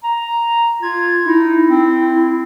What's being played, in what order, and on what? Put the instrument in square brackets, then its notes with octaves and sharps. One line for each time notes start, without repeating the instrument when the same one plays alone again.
[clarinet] A#5
[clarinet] F4 [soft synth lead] G#6
[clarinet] D#4 [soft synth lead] E4
[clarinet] C4